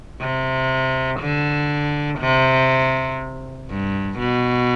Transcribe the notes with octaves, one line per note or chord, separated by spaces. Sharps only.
C3
D3
C3
G2
B2